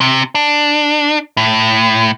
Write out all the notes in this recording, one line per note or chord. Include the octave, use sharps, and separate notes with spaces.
C3
D4
A2